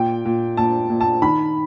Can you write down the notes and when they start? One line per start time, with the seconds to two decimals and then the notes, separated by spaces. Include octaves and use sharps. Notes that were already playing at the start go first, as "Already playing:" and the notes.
Already playing: A#2 G5
0.25 A#2
0.57 A#2 A5
0.90 A#2
1.01 A5
1.22 D#3 B5